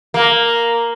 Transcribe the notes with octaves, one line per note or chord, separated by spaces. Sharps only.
A#3